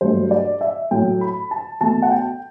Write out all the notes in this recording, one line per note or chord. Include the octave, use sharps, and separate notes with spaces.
G2 F#3 A3 C5
D5
E5
A2 F#3 A3 G5
B5
A5
B2 A3 A5
F#5
G5